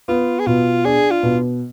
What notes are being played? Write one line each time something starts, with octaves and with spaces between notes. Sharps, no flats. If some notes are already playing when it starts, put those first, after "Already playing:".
B3 F4
G#4
B2 F4
D4 G#4
F4
B2